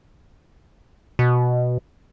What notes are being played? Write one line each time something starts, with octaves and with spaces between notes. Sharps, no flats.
B2